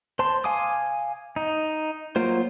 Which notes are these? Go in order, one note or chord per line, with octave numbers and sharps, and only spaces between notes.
C5 A5 C6
F5 G#5 D6 D#6
D#4
F#3 A#3 F4 C5